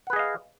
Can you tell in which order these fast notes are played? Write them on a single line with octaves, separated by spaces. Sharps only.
F#5 B4 G#4 D#5 F5